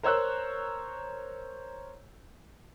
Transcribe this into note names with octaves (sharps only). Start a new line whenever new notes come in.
A#4 C5 C#5 E6 F#6